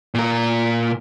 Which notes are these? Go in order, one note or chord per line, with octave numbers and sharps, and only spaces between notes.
A#2 A#4